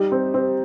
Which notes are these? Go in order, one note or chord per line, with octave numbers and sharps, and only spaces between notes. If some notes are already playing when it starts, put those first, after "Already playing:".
Already playing: G3 D#4
C4
C4